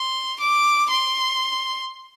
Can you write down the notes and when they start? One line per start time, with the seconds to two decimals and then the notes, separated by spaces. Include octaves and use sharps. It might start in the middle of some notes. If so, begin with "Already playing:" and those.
Already playing: C6
0.40 D6
0.90 C6